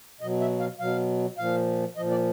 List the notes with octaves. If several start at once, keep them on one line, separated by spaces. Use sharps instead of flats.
B2 F#3 D#5
E5
F5
B2 F#3 F5
A#2 F3 F5
A#2 F3 D#5
D5